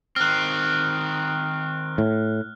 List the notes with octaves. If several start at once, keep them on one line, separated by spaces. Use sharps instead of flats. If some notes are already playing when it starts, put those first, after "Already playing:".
D#3 C4 F6 F#6
A2